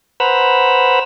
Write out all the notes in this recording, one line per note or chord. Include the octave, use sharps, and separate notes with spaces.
B4 C5 F#5 A#5 B5 E6